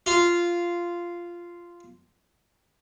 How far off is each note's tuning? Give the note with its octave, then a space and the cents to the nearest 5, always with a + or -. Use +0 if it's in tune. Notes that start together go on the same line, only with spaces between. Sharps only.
F4 -10